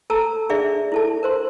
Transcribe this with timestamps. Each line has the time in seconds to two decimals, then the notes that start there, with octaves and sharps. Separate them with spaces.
0.10 A4 A5 A#5 E6
0.49 D4 G#4 D5 E5
0.92 E4 A4 A5
1.23 A#4 C5 C6